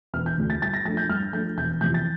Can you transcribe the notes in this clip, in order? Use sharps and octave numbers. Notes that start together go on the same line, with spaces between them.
E1 F6
G6
D2 D3
A6
G2 A6
A#6
F3 A3 D4 A6
G6
G2 F6
F3 A3 D4 G6
E1 G6
E2 C3 F3 G6
A6